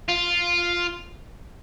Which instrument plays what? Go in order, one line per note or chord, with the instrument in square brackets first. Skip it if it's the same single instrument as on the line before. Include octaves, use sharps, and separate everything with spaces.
[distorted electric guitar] F4